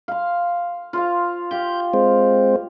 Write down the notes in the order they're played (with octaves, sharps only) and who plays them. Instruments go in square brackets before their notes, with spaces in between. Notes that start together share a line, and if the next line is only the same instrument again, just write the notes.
[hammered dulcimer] F5 C6
F4 C5 F5
[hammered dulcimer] G4 F5 [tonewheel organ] G6
[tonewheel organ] G#3 C4 C5